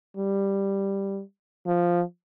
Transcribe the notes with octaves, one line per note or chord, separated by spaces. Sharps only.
G3
F3